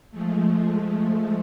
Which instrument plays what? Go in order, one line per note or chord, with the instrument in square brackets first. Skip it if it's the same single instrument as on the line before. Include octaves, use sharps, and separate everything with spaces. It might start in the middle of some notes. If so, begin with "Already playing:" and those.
[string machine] F3 G#3 A3